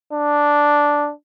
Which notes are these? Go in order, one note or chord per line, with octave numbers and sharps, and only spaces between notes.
D4